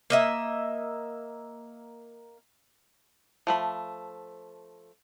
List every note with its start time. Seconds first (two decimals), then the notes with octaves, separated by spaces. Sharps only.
0.10 A#3 D#5 E5
3.47 F3 A3 B5